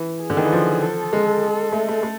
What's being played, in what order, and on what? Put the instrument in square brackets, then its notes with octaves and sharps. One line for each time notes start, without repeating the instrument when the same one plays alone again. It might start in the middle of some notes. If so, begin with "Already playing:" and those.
Already playing: [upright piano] E3
[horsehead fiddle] G#4
[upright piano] D3
D#3
E3
F3
[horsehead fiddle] A4
[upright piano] G#3
A3
A3
A3